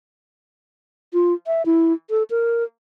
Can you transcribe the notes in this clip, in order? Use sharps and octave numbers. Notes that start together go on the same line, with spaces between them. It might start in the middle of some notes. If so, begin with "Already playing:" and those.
F4
E5
E4
A4
A#4